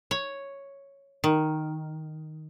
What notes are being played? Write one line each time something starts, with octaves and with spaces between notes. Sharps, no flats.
C#5
D#3